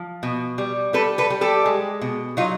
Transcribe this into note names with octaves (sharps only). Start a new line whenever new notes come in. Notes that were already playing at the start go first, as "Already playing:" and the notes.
Already playing: F3
B2
G3
G3 A4 B4
A4 B4
G3
G4 A4
G#3
B2
F#3 D#4 F4